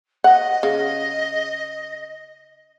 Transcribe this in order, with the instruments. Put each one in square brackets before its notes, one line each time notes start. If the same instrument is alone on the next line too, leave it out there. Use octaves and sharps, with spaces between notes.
[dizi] D#5 [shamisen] F#5
[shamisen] C#3